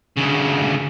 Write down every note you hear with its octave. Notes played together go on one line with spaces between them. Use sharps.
D2 C#3